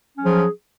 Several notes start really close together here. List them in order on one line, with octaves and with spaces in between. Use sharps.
C#4 F#3 G#4 F3